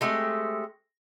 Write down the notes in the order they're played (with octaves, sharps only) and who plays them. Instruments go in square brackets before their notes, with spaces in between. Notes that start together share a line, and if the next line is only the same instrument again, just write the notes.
[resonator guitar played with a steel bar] G#3 A3 C4 G4